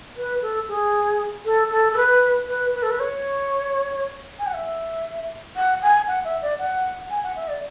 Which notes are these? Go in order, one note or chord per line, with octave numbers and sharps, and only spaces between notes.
B4
A4
G#4
A4
A4
A4
B4
B4
B4
A4
B4
C#5
G#5
F#5
E5
F#5
G#5
F#5
E5
D5
F#5
G#5
F#5
E5
D5